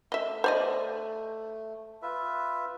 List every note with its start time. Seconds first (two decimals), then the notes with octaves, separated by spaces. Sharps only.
0.12 A3 D#5 E5
0.44 C5 D5 D#5
2.02 F4 B4 E5